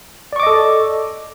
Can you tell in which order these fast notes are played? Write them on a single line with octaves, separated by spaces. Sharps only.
D5 C#6 D6 D#5 A4